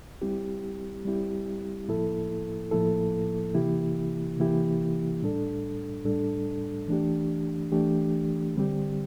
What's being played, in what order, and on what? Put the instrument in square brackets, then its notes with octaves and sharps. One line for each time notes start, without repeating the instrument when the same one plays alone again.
[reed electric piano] G3 C4 E4 G4
G3 C4 E4 G4
A2 F3 A#3 E4 A4
A2 F3 A#3 E4 A4
C3 E3 A#3 E4 G4
C3 E3 A#3 E4 G4
A2 G3 D4 A4
A2 G3 D4 A4
E3 A3 D4 G4
E3 A3 D4 G4
D3 G3 C4 G4